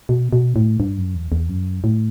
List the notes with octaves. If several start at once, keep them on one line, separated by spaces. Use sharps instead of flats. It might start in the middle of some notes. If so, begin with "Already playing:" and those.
B2
B2
A2
G2
F#2
E2
E2
F#2
A2